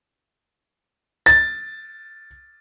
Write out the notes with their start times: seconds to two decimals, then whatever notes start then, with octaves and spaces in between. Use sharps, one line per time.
1.26 A6